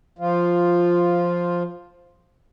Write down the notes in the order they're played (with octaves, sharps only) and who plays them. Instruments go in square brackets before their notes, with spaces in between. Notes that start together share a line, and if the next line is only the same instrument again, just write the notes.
[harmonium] F3 F4